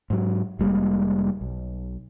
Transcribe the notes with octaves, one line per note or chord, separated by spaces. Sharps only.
G#2 F#3
F1 G3 G#3 A#3
B1